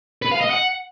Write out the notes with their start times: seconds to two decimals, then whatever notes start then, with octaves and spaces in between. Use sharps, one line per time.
0.22 B4
0.31 F5
0.41 D#5
0.50 F#5